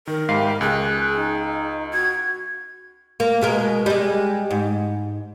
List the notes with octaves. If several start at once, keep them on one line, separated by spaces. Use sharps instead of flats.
D#3 A#4
G#2 G4 E5 F5 B5 C7
C#2 G#4 F#6
D#4
F#4 G#6
A#3
B2 G#3 A#4
G3 G#3
G#2